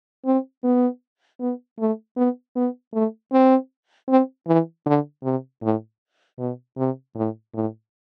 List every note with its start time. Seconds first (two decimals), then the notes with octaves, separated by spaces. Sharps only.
0.26 C4
0.64 B3
1.40 B3
1.79 A3
2.17 B3
2.56 B3
2.94 A3
3.32 C4
4.08 C4
4.47 E3
4.86 D3
5.24 C3
5.62 A2
6.39 B2
6.77 C3
7.16 A2
7.54 A2